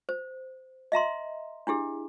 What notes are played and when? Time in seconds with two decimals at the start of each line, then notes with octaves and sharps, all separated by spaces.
0.09 C5
0.92 D#5 E5 A#5 C6
1.67 D4 E4 G4 G#4